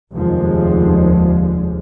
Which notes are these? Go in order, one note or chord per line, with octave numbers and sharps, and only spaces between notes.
F1 D#2 D3 F3 G#3